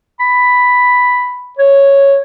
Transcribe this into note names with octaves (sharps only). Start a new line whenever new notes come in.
B5
C#5